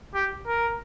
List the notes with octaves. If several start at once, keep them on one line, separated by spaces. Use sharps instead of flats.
G4
A#4